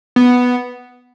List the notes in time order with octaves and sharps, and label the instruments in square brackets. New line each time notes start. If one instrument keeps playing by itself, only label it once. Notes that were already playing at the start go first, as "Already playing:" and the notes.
[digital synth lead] B3